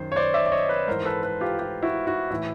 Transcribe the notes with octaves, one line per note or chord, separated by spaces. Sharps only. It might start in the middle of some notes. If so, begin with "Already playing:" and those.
Already playing: F#2 D#3 C5
C#5
C5 D5
D5 E5
D5
C#5 D#5
B4 C#5
G#2 E3 A#4 C5
A4 B4
A4 B4
F4 G4
F4 G4
E4 F#4
E4 F#4
A2 E3 E4